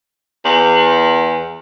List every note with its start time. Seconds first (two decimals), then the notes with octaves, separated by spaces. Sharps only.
0.45 E2